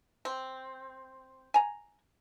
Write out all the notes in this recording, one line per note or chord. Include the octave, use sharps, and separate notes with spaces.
C4
G#5 A#5